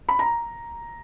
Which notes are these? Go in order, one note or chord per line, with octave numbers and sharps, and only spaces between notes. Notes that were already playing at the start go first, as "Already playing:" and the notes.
B5
A#5